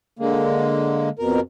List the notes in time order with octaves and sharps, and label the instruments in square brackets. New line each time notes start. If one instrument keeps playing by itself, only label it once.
[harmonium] D3 G#3 A#3
F2 B2 A#4